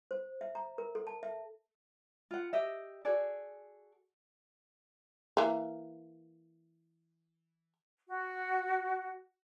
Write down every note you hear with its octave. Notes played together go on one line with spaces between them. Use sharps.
C5
E5
A#5
A#4
A4
A5
E5
F4 F#5
G4 D#5 E5
F#4 G#4 A4 D5
E3 A#3
F#4